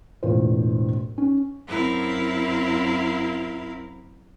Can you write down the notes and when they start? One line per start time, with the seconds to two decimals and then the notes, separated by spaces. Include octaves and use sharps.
0.23 E1 E2 A2 F4 C5
1.18 C#4
1.67 F#2 C4 E4 A#4 F5